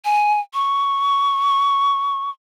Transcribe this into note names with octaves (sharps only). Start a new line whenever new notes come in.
G#5
C#6